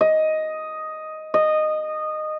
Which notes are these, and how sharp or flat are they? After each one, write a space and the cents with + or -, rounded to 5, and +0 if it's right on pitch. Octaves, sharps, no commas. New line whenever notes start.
D#5 +5
D#5 -15